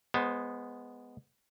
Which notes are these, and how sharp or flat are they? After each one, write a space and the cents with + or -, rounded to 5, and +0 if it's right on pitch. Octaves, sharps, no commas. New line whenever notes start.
G#3 -5 B3 +0 C5 +20